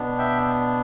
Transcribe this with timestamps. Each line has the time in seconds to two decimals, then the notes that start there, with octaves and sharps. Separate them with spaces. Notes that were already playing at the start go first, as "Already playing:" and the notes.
Already playing: B2 B3 D4
0.18 E5 G5